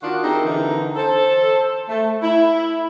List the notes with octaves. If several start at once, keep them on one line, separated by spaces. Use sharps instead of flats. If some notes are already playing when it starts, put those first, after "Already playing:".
D#3 D4 F4 F#4
C4 D#4 E4 G4 G#4 A#4
D3 E3 D#4
A4 C5
A3
E4